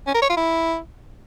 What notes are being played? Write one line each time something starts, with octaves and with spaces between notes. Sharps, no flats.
C#4
A#4
C#5
F4
E4